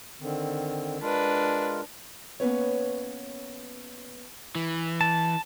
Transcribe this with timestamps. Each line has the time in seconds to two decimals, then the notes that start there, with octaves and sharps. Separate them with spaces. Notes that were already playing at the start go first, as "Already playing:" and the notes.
0.21 D3 D#3 C4
1.01 G#3 D4 F4 A#4 B4
2.40 A#3 B3 C#4 B4 C#5
4.55 E3
5.01 A5